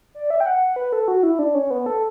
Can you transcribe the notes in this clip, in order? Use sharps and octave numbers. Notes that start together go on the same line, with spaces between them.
D5
E5
G5
F#5
B4
A4
F#4
E4
D4
C#4
B3
A4